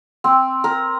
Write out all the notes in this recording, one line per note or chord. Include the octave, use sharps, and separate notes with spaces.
C4
A#4